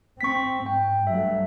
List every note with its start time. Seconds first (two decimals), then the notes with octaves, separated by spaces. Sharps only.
0.21 C4 C#6 B6
0.66 G#2 G5
1.07 G2 F#3 A3 E5